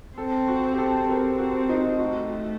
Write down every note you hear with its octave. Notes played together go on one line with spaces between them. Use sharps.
C4 A4
F#4
G4
A4
C4 A#4
F#4
D#4
A3 F#4